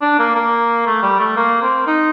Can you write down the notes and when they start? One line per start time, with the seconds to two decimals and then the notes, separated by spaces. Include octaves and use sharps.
0.02 D4
0.19 A#3
0.35 A#3
0.86 A3
1.03 G3
1.20 A3
1.36 A#3
1.62 C4
1.87 D#4